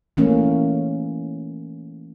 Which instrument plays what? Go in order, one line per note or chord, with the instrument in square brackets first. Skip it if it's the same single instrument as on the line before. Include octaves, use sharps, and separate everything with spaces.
[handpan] E3 A3 A#3 C#4